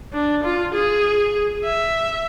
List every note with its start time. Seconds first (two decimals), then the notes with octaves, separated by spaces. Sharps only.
0.13 D4
0.43 F4
0.74 G#4
1.64 E5